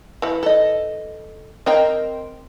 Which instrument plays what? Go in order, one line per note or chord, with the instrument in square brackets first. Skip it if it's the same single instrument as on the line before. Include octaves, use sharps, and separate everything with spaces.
[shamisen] E3 E4
[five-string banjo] A4 D#5
[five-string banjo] C4 A#4 G5 [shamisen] D#5